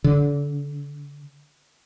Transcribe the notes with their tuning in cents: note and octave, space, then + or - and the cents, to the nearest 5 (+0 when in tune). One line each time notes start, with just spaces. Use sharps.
D3 -30